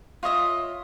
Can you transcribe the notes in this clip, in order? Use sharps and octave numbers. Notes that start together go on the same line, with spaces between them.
F4 C#5 D#5 E5